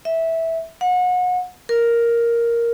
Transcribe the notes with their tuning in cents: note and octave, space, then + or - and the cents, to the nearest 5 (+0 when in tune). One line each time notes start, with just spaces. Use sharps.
E5 -10
F#5 -30
A#4 +5